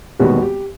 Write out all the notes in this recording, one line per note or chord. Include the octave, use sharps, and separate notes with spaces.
E1 D#2 D#3 G3 B3 F#4
G4